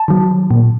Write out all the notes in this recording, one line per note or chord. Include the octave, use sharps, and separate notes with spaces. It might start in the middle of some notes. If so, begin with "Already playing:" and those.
Already playing: A5
D#3 F#3
A#2